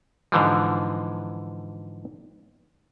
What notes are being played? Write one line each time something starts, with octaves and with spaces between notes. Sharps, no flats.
G#2 D3 E3 F3